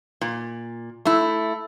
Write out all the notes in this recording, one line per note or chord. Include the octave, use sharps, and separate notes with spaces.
A#2
A3 E4